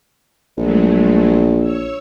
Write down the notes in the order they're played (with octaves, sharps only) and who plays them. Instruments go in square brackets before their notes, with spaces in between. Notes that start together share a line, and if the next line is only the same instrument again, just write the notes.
[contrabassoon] A#1 [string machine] F#3 G#3 A3
[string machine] C#5 E6